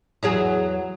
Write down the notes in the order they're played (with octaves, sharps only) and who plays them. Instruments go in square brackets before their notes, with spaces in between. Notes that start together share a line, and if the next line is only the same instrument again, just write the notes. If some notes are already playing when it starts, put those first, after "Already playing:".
[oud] E2 F#3 G#4